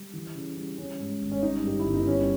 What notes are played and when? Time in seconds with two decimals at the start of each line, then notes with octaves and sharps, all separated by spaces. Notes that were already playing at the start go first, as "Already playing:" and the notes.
Already playing: G3
0.13 E3
0.35 C#3
0.57 G3
0.78 G3 C#4
1.00 G#2
1.22 G#1
1.32 C#4
1.43 G3 D#4
1.64 G2 G4
1.80 E4
1.86 G1
1.94 D#4
2.07 G3 C#4